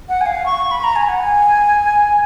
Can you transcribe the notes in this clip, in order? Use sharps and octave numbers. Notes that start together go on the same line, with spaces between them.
F#5
G#5
F5
C#6
B5
A#5
G#5
F#5
G#5